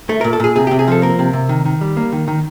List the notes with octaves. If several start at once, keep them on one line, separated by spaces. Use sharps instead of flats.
A3
A#2 A#4
A4
A#2 G#4
C3 G#4
C3 G4
G#4
F3 A4
A#3 A#4
C3
C3
D#3
D#3
G3
A#3
D#3
D#3